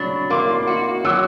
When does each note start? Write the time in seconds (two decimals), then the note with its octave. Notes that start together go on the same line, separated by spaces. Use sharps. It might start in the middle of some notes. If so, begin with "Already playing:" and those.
Already playing: F#3 D4 B5 C#6
0.30 A#3 C6 D6
0.67 F#4
1.05 F#3 D6 E6